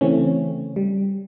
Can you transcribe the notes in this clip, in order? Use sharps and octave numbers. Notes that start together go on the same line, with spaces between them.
C#3 E3 A3 C4 C#4
G3